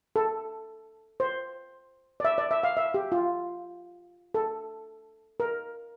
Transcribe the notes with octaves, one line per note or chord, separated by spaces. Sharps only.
A4
C5
D5
E5
D5
E5
F5
E5
G4
F4
A4
A#4